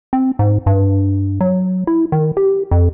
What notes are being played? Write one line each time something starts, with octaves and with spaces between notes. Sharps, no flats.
C4
G#2
G2
F#3
E4
D#3
G4
F2